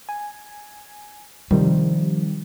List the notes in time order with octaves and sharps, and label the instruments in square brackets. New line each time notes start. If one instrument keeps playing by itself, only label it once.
[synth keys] G#5
[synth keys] C3 D#3 G3 [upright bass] F3